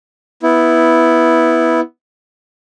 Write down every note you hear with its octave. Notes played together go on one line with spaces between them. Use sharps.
B3 E4